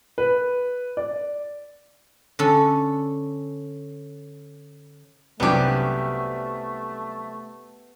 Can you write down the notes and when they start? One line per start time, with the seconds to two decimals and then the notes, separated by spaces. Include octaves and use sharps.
0.18 B4
0.97 D5
2.39 D3 C#4 A4
5.40 C2 F#2 A3 B3 D4 G4